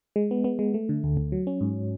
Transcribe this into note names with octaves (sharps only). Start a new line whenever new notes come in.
G#3
B3
B3
G#3
A3
D3
D2
D2
F#3
C#4
G#2